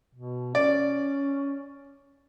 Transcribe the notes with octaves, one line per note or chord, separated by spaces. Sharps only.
B2
C#4 D5